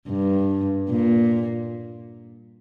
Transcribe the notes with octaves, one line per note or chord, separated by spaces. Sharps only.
G2
A#2